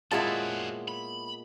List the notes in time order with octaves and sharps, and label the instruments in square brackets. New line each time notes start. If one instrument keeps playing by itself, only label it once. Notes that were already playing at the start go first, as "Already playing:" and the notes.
[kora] A#2 G#3 B3 [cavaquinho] E4 C#5 A5 [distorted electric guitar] F#4 C5
[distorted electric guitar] B5